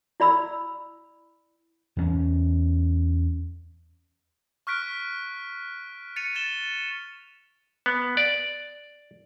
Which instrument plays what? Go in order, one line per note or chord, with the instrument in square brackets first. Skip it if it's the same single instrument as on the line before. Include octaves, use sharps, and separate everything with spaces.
[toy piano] E4 D5 B5 E6
[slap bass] E2 B3 C#4
[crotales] C#6 F6 F#6 B6 D7
A6 C#7 D#7 F7
A6 E7 G7
[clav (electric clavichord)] B3
D5